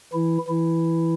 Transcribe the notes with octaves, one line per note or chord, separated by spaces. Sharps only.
E3 E4
E3 E4